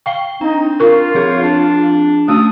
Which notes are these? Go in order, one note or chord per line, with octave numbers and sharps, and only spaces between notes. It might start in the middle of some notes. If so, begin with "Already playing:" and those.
F5 G5 C#6 C7 G7
C4 D4 D#4 A#5
F4 A#4 C#6
F3 C4 G#4 C#5
D4
A3 C#4 F#4 A5 D#6 E6